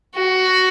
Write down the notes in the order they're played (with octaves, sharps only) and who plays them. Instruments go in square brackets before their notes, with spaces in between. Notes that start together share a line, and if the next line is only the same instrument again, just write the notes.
[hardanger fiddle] F#4